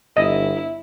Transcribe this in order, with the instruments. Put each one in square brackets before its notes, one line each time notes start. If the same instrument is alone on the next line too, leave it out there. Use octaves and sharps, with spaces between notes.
[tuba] G1 [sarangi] E4 [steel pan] D#5